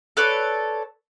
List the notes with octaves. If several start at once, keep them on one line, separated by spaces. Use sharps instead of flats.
A4 B4 C#5 D5